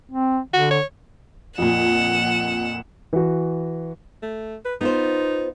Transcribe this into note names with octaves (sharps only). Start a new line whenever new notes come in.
C4
D3 F#4
C#5
F2 A#2 F#5 E7
E3 F#4
A3
B4
B3 D#4 F4 C5